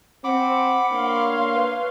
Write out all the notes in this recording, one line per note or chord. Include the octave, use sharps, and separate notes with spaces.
C4 F#5 B5 D6
A#3 D4 C#5 F5 C6
B4